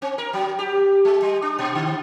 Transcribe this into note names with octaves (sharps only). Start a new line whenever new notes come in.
C4
A#4
F#3
G4
G#3
G3
D4
A#2
D3